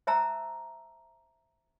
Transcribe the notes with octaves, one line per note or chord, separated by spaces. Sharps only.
C5 E5 A5 A#5 E6